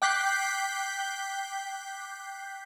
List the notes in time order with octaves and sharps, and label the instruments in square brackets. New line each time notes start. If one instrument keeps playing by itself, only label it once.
[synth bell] G5 D6 F#6 G6 B6 C7